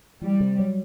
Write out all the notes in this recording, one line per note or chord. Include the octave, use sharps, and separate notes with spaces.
E3 G3
C3
F#3